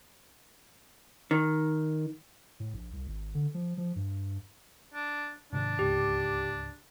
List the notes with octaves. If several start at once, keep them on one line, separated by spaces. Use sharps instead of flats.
D#3
A2
A#1
C2
G#1
D3
F3
F3
G2
D4
G#2 C3 D#3 D4
D1 C#2 G#2 G4